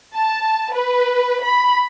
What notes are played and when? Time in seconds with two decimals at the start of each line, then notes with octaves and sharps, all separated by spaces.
0.15 A5
0.71 B4
1.41 B5